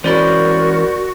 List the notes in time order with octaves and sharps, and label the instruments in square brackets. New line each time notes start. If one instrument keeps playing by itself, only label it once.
[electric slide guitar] E3 G#3 C#4 [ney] F#4 [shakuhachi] A#4 [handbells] C5 D5 B5